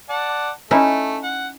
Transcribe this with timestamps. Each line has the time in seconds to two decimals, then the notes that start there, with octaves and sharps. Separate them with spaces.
0.09 D5 F#5 A5
0.71 A3 C#4 D#4 E4
1.23 F#5